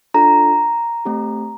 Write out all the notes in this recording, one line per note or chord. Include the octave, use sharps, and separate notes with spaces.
D4 F4 A4 A#5
A3 C4 G4